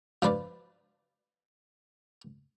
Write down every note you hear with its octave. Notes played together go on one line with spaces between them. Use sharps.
F3 D4 B4 D5